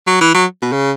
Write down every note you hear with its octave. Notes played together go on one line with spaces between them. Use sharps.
F#3
E3
F#3
B2
C#3